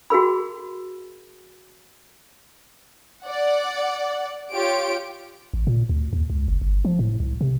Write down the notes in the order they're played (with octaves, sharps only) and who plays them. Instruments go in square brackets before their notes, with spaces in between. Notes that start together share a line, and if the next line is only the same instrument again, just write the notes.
[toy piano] F#4 G#4 A#4 B5
[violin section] D5 F#5
F4 G4 C#5 D7
[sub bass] A1
A#2
D2
D#2
C#2
F#1
G1
F3
A2
C2
C3